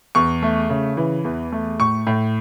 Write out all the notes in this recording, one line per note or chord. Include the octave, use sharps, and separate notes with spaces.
E2 C#6
A3
C#3
E3
E2
A3
A2 C#6
A2